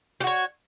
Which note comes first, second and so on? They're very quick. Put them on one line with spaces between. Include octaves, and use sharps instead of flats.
G4 F#4 C#5